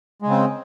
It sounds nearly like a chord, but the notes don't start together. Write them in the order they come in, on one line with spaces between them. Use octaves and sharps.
G#3 C#3 C4